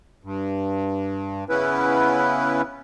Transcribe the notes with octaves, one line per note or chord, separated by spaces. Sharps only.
G2
C#3 B3 C#4 E4 B4